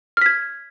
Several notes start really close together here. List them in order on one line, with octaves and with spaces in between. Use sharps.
F6 B6 G#6